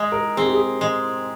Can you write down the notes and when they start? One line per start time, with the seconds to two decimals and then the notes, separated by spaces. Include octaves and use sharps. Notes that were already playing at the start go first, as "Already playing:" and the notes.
Already playing: G#3
0.12 A#4
0.37 C4 G#4
0.46 G4
0.55 G#4
0.81 G#3